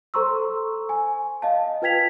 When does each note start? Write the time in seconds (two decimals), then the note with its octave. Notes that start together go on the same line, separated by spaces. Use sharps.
0.14 A4 C5 A#5 C6 C#6 E6
0.89 G#5
1.42 D#5 F5 A5
1.82 F4 B4 G5 G#6 B6 F7